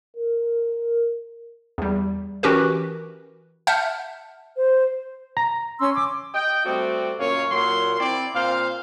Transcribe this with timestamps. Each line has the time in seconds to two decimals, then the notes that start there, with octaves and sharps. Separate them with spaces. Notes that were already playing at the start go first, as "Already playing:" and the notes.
0.17 A#4
1.78 E2 G3
2.43 E3 C#4 F#4 G4 A#4 B4
3.67 E5 F#5 A5 F6 G6
4.56 C5
5.37 A#5
5.79 C#4 C6 E6
5.94 D6
6.35 D#5 G5
6.65 G3 A3 C4 F#4 D5
7.19 F#2 A#2 A#3 C#4 C#5 F5
7.51 A#2 F#3 A#3 C6
8.00 C4 E4 D5
8.34 A#2 C4 C5 F5